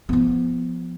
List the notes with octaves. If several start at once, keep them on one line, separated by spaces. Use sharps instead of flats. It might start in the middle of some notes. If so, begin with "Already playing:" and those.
F3 B3